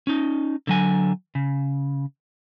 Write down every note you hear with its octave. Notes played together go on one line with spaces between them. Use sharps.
C#4 D#4
D3 F#3 G#5
C#3